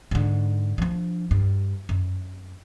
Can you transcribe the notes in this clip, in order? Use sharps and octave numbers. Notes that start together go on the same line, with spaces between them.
G#2 D3
F3 D4
G2
F#2